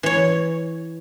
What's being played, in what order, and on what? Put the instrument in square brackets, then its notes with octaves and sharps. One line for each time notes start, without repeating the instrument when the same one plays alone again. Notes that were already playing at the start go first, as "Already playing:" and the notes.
[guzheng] E3 C#5